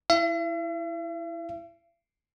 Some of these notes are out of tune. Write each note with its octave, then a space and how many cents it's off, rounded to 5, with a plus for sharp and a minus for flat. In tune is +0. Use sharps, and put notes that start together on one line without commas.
E4 +0 E5 +45